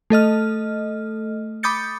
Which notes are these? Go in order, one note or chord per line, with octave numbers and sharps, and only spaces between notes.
A3 A4 D#5 F6
B5 D6 D#6 G6 A6 C#7